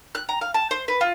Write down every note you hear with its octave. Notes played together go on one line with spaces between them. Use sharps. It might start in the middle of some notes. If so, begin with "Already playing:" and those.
F#6
A#5
F5
A5
C5
B4
F4